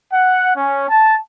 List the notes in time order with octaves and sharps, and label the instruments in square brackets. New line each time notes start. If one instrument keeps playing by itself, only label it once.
[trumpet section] F#5
C#4
A5